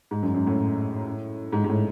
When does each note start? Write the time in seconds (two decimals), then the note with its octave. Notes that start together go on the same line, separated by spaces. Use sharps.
0.11 G#2
0.23 F#2
0.34 F#2
0.47 A2
1.53 G#2
1.64 G#2
1.69 A2